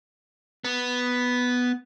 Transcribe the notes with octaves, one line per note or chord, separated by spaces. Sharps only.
B3